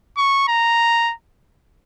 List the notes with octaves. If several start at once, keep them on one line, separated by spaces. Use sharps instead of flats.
C#6
A#5